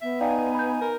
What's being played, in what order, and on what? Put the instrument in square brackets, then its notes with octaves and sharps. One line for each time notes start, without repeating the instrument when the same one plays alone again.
[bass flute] B3 [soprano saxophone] E5
[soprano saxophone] D#4 [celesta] D5 F5 G5 [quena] G#5
[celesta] B5 G6
[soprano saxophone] A#4